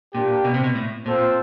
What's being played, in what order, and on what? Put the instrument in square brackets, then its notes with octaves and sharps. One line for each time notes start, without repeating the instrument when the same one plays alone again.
[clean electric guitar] A#2 [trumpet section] A#3 D4 G4
[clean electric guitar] B2
C3
B2
A2
[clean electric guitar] A#2 [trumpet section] C4 F4 A4 C5